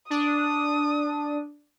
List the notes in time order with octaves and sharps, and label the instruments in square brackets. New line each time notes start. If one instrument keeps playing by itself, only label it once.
[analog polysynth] D4 [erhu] D#6